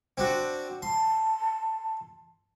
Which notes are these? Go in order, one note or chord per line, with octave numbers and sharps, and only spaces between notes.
C4 D4 F#4
A5 C6